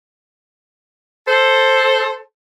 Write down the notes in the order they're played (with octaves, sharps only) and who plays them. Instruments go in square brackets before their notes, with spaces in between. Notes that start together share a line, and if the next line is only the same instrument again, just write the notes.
[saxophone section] A4 C5